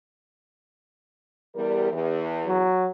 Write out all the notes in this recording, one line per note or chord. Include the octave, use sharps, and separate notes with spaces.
E2 G3 A#4
E2
F#3